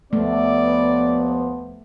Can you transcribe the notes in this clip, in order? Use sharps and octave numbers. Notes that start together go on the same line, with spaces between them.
D#2 F3 A3 B3 D5